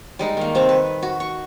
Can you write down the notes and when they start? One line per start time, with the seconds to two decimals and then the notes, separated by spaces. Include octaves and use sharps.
0.19 G3 G#3 D#4
0.37 D#3 A#3
0.55 C3 C4 A5 C#6
0.69 B4
1.03 F#4
1.20 C#6